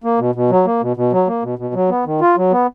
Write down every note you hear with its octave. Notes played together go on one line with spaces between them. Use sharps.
A#3
B2
B2
F#3
A#3
B2
B2
F#3
A#3
B2
B2
F#3
B3
D#3
F4
F#3
B3